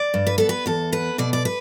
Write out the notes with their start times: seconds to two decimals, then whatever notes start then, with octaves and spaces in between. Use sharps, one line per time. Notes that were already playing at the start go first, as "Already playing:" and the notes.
Already playing: D5
0.14 G2
0.27 B4
0.38 B3 A4
0.49 B4
0.66 E2 A4
0.92 B3 B4
1.18 B2 D5
1.33 D5
1.45 B4